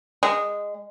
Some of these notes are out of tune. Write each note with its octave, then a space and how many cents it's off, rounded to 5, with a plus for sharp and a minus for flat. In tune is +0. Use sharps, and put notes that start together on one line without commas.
G#3 -15